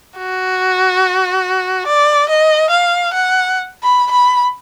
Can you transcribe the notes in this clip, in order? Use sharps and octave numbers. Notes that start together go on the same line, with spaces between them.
F#4
D5
D#5
F5
F#5
B5
B5